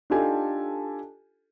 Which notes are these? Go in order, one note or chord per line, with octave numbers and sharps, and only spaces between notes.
D4 D#4 F4 G4 A4 G#5